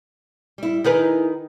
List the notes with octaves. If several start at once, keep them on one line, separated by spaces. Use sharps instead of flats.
G3 E4
D#3 D#4 E4 G#4 A#4 B4